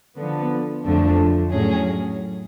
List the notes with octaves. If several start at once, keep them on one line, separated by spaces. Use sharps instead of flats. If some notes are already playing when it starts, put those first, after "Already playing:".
D3 F3 B3
F2 D3 F3 A3 D4
A2 F#3 C#4 G#4